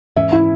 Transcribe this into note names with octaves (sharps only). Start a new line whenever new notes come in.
G#2 E3 C#4 E5
E4